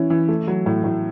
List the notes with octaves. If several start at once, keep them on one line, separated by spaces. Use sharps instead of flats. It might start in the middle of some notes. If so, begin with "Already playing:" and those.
Already playing: E3 C#4 E4
E3
A3
F#3
A2
A2